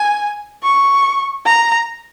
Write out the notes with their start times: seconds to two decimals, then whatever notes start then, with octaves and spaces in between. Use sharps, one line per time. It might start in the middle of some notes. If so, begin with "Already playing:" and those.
Already playing: G#5
0.63 C#6
1.45 A#5